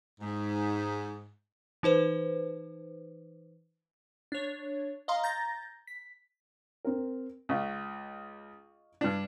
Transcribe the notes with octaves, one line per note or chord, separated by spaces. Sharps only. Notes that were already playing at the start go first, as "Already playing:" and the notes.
G#2
E3 D#4 B4 C5
D4 C#5
D#5 F5 A#5 C6
A#5 G6 A6 A#6
B6
C4 A#4
C#2 D#5 F5 C#6
G2 D4